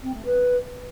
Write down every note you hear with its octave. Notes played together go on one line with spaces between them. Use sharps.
C4
A3
B4